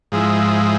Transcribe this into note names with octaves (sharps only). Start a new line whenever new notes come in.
G#2 F3 G#3 E4